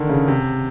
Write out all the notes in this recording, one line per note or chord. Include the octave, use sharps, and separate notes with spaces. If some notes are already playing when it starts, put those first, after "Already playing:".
Already playing: D3 D#3
C#3
C3